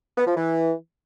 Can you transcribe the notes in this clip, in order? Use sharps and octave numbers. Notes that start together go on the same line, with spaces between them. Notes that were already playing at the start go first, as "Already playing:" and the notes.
B3
F3
E3